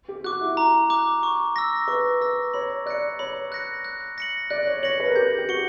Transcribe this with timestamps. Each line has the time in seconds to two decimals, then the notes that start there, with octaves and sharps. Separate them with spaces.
0.08 G4
0.24 F#4 D6 F#6
0.41 E4
0.57 A#5
0.90 D6 F#6
1.23 C#6
1.56 E6 A#6
1.88 B4 C#6
2.21 B4 E6 A#6
2.54 C#5 B5
2.86 D5 F#6 A#6 C#7
3.19 C#5 B5
3.52 F#6 A#6 C#7
3.85 F#6
4.18 A#6 C#7 F#7
4.50 D5 F#6
4.67 C#5
4.82 C#5 A#6 C#7 F#7
5.00 B4
5.07 A#4
5.16 G4 G6
5.38 G4
5.49 F#4 C#7 G7